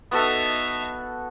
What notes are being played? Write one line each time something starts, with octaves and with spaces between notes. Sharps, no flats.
B3 D#4 F#4 A4 E5